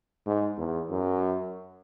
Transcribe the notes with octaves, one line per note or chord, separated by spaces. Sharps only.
G#2
E2
F#2